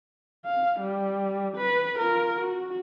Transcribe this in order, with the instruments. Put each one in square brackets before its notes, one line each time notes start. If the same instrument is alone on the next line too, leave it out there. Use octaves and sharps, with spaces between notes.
[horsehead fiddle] F5
G3
B4
F4 A#4
F#4